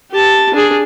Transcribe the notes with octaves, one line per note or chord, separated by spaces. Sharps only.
G4 A5
D4 G#4